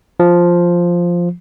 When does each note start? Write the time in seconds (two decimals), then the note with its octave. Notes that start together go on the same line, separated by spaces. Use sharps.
0.20 F3